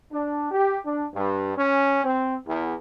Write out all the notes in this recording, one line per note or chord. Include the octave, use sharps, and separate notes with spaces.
D4
G4
D4
G2
C#4
C4
E2